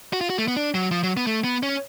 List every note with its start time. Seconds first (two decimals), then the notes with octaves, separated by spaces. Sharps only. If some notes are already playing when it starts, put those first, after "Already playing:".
0.13 F#4
0.21 F4
0.30 F#4
0.38 A3
0.48 B3
0.56 D4
0.74 F#3
0.91 F3
1.03 F#3
1.17 B3
1.27 A3
1.44 B3
1.63 C#4